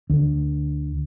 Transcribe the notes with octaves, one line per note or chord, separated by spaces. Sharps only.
D2